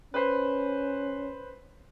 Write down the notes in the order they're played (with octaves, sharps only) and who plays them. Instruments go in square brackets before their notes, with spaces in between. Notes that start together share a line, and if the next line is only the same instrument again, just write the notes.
[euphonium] C#4 [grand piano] B4 C5